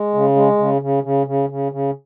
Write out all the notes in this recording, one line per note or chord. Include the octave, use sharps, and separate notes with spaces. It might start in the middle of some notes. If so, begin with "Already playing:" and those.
Already playing: G#3
C#3
G#3
C#3
C#3
C#3
C#3
C#3
C#3